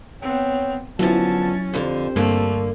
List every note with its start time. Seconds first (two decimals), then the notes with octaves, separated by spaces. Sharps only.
0.23 B3 C4 C#5 G5
0.99 D3 F3 F#3 B3 C#4 E4 A5 A6
1.74 F2 D3 C4 G4 C5
2.16 G2 D3 A3 A#3